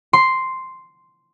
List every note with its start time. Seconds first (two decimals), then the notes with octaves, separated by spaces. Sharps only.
0.13 C6